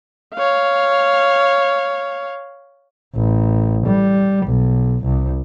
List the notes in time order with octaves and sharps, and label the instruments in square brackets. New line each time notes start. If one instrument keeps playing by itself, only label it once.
[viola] C#5 F5
[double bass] A1
G3
B1
C2